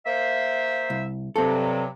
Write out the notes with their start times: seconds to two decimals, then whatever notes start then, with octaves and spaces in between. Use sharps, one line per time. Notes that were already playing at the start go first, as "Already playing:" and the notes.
0.06 A#3 C5 E5
0.90 C2
1.36 G2 C3 F#3 C4 A4